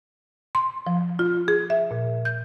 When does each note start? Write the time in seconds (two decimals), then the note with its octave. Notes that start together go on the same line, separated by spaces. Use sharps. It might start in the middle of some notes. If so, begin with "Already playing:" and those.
0.55 C6
0.87 F3
1.19 F4
1.48 G#4
1.70 E5
1.91 A#2
2.25 G6